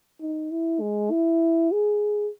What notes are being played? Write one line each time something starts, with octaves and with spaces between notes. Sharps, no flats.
D#4
E4
G#3
E4
G#4